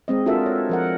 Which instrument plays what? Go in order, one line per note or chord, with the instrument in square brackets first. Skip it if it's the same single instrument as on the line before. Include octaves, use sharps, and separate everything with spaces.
[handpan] G#3 C4 D#5
D4 F4 F#4 A4 A#4 E5
C#5
F3 A#4 F#5